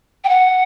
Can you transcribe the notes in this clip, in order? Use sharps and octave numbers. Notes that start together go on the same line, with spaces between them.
G5
F#5